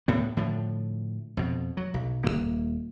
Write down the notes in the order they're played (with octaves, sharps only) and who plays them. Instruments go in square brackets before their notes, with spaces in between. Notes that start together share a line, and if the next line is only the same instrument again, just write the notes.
[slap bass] D2 A2 B3
A2 D3 F3
F2 B2
F#3
B1
D#1 D#2 A#3